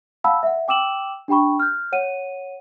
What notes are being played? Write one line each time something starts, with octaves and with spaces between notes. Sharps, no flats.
F5 F#5 A5 B5 E6
E5 F#5
G5 D6 E6 E7 F#7
D4 G4 G5 B5 C#6
F6 G6
C#5 F#5 D#7